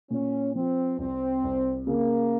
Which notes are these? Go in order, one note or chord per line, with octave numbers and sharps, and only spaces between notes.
A#2 C#4
F3 C4
C2 C4
C2
C#3 A#3